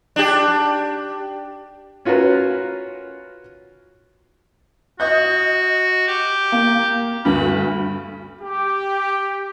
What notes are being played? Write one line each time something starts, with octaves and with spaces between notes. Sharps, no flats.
D4 G4
C#4 F4 F#4 A#4 B4
F#4 D#5 G6
G4
A#3
D2 G2 B5
G4